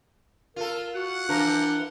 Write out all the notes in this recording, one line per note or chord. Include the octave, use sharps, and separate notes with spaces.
F4 A4 A#4
F#4 F#5
E3 F3 D4 A#4